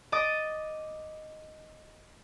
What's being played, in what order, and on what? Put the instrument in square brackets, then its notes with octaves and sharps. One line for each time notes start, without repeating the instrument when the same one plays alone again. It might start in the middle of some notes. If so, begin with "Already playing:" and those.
[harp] D#5 D6 D#6 A6 D7